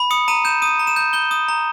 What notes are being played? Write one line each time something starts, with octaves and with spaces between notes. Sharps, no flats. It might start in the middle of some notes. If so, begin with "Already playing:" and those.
Already playing: B5
D#6 C#7
A#5 D#7
G6 E7
D#6 D#7
A#5
E7
G6
G6 G7
D#6
A#5